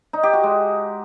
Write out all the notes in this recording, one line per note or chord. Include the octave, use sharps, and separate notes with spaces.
D#4
G4
F#4
G#3